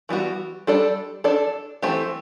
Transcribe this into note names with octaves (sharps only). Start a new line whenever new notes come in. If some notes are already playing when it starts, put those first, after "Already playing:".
E3 G3 B3 F#4
G3 D4 A4 D5
D4 A4 D5
E3 A3 C4 G4